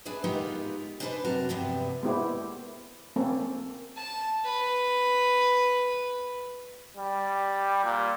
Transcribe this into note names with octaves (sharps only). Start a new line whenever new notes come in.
D4 E4 G#4 B4
G#3 B3 D#4 F4 G4 A#4
D4 D#4 G#4 A4 B4 C5
F#2 C3 F#4 A#4 A5
E2 G2 C3 F3 B3
G#3 A#3 B3 E4 G4 C5
A#3 C4 C#4 A4
A5
B4
G3
A#2